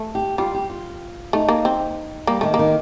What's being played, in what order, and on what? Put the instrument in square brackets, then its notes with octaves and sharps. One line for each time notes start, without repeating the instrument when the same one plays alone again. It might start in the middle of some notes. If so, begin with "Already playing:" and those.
Already playing: [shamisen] A3
[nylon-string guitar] G4
[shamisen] G3 [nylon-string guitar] F4
[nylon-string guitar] G4
F4
[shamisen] A3 [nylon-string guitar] D#4
[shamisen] A#3
C4
[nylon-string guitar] G3 [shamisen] A#3
[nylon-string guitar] D#3 [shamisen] A3
[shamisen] A#3
[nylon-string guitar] D#3